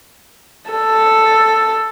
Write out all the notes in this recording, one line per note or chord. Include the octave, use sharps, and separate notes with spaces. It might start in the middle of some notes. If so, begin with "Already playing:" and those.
A4